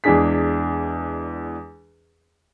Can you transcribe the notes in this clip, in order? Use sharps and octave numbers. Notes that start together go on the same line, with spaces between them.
E2 G#3 D4 G#4 B6